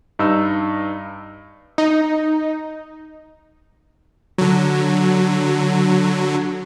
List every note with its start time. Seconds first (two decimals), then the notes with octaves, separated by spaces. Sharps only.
0.19 G2 D#4 E6
1.78 D#4
4.38 D3 F#3